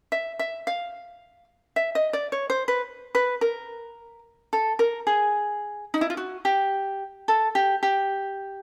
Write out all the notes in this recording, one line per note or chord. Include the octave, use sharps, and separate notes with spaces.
E5
E5
F5
E5
D#5
D5
C#5
C5
B4
B4
A#4
A4
A#4
G#4
D#4
E4
F4
F#4
G4
A4
G4
G4